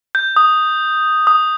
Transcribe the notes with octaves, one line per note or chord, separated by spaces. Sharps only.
G6
D#6
D#6